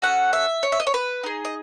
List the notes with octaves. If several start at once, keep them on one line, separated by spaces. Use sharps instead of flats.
C#4 F#4 A4 F#5
E5
C#5
E5
D#5
C#5
B4
D#4 G#4
D#5